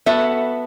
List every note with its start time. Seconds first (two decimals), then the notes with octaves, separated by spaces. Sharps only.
0.06 B3 F#4 A4 E5